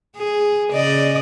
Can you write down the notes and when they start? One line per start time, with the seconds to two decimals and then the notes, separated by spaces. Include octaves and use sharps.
0.17 G#4
0.71 C#3 D5 D#5